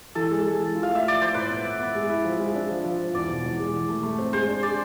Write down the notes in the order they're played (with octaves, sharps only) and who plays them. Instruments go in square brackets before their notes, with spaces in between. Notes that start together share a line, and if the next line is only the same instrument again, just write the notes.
[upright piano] E3 [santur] A4
[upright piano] G#3
G#3
E3
F4
[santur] F5
[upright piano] A3
[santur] E5
[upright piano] F4 [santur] D5
[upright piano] F3 [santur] C5
[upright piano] A2 [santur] B4
[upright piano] B3
B3
B3
G#3
E4
F3
G#3
D4
F3
F3
F3
[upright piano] E2 [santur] D5
[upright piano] B2
E2
G#3
E3
A3
A3
C4
[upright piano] G#3 [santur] C5
[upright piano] D4
[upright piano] G#4 [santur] D5